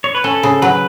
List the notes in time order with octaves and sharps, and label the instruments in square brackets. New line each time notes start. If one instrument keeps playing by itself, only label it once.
[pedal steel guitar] C#5
B4
[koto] C#4 [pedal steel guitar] A4
[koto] C#3
[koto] F#3 [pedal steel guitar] B4